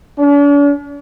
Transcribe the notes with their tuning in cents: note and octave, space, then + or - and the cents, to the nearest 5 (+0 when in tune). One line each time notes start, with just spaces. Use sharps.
D4 -45